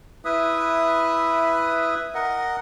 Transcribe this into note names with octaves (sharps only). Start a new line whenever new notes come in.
E4 B4 E5 D#6
A#4 D#5 F#5